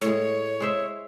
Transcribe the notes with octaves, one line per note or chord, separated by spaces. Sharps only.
A2 G#3 C#5
G#3 C5 E5